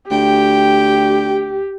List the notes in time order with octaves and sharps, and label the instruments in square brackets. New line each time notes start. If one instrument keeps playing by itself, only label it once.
[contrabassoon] D2 [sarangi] G4 [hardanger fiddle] G5